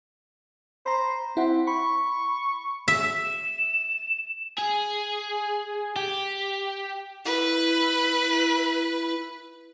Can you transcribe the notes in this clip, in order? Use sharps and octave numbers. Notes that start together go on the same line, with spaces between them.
C5 A#5 B5
C4 E4 F#5
B5 C#6
E5
E7
G#4
G4
E4 B4